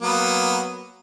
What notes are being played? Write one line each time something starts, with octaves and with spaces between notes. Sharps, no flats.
F#3 A#3 B3